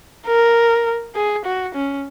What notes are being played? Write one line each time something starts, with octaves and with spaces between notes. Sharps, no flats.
A#4
G#4
F#4
C#4